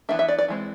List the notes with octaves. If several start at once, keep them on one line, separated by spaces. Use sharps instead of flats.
E3 B3 D4 E5
E5
D5
D5
E3 G#3 C4